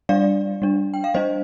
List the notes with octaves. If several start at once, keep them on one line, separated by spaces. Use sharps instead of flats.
G3 D4 D5 F5
G3 D4
G5
F5
G3 D4 C5 D#5